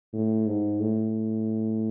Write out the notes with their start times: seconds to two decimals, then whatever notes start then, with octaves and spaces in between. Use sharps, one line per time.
0.13 A2
0.46 G#2
0.80 A2